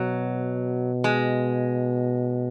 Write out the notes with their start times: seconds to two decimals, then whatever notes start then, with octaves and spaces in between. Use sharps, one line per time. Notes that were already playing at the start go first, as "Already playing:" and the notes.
Already playing: B2 F#3
1.04 G#3